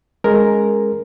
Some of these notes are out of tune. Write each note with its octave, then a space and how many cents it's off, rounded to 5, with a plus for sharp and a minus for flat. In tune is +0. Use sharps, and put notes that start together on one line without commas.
G#3 +0 C#4 +0 A#4 +5